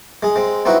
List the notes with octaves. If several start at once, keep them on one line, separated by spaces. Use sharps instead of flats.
G#3 G#4
G#3 C4
C4 D#4 E4 F#4 B4